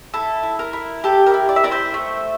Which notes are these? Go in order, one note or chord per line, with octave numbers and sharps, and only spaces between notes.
E4 A4
E4
A#4
E4
G4 A4
A#4
E4
D5
E5
E4 A#4 D5
C5 E5
A3